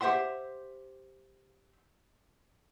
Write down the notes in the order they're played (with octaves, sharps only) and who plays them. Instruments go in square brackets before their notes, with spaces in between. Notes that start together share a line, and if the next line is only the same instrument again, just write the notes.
[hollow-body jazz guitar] G4 C5 E5 F#5 C6